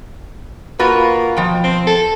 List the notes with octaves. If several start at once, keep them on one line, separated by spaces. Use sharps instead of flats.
A#3 F4 F#4 B4
B2 F3 G5
C4
A4